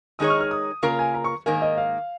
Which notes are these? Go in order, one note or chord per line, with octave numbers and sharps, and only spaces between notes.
D#3 G#3 D#4 G#4 C#5 D#6
F6
F6
D#6
C#3 A#3 F4 A#4 A#5
G#5
A#5
C#6
G#2 D#3 A#3 G#5
D#5
F5